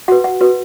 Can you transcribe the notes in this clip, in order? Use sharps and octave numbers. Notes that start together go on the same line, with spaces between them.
F#4 B4 F#5
F#5
F#4 B4